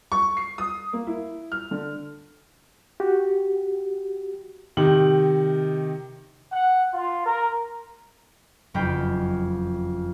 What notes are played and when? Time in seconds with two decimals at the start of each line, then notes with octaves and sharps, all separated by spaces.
0.12 C#6
0.37 C7
0.58 D#6
0.93 A#3
1.07 E4
1.52 F6
1.71 D3
3.00 F#4 G4
4.77 C3 D#3 F#7
6.52 F#5
6.93 F4
7.25 A#4
8.74 F#1 F2 A#4 G5 B5